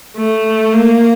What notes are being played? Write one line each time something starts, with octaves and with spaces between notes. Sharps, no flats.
A3
A#3